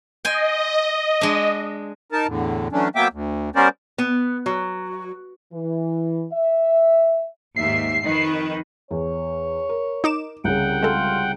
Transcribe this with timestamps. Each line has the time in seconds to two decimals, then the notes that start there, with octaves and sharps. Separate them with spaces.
0.25 D#5 G5 G#5 C6
1.21 G#3 D4
2.12 D#4 A#4 A5
2.27 E2 A2 D3
2.72 E3 F#3 A3 C#4 D4
2.95 F#3 A#3 B3 E5 G5 D6
3.13 D2
3.56 G3 B3 C#4 A#4 C5 D5
3.98 B3
4.46 F#3
5.53 E3
6.33 E5
7.56 D#2 G#2 E5 C7
8.02 F2 D#3 B4
8.91 E2 C#5
9.69 A#4
10.04 D#4 D6 E7
10.44 C2 C#3 F#5 G5
10.83 G#3 F4 A4